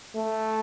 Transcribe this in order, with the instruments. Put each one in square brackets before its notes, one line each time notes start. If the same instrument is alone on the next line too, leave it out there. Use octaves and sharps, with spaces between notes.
[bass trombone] A3